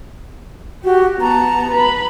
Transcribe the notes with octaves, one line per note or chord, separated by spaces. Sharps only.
F#4 G4
B3 A5 A#5
B4 B5